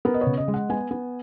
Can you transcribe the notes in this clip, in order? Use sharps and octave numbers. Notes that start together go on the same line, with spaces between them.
B3 A#4
D#5
C#5
C#3
D#5
G#3
F#5
B3 G#5
B3